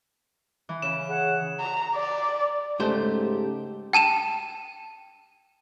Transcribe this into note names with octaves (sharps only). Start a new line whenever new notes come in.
E3
C#3 E7
G#4 C#5 F#5
A#5
D5
G#2 C#3 A3 G4 C5
G5 A5 D#7 E7